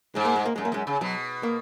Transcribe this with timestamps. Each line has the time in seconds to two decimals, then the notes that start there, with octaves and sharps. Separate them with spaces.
0.15 G#2 G#3
0.25 A#3
0.36 G#3
0.45 A#3
0.56 F#2 G#3
0.65 A#3
0.72 F#2 G#3
0.87 C#3
1.01 B2 F#3
1.43 A#3